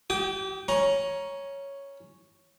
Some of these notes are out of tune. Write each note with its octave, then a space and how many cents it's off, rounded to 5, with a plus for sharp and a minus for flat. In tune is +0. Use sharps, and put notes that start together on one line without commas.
G4 -35 G5 +0 D#6 -5
C#4 +0 A#5 +15